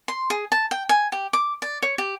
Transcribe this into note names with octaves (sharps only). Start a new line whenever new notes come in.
C6
G#4
A5
G5
G#5
G4
D6
D5
C#5
G4